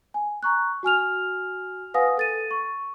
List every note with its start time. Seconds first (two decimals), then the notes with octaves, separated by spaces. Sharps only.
0.14 G#5
0.43 A#5 C#6 F#6
0.83 F#4 G#5 F6 F7
1.94 B4 F5 F#5 G#5 D#6 A#6
2.17 A4 A6 D#7
2.51 C#6